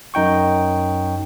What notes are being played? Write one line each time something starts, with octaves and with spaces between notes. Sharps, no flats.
F#2 D#4 G5 C#6